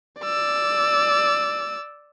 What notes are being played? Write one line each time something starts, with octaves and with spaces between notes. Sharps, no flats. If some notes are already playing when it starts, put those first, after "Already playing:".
D5 E6